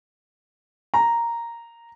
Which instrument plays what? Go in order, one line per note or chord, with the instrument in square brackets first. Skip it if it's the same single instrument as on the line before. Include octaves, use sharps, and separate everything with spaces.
[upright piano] A#5